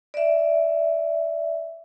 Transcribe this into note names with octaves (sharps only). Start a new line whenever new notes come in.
D5 E5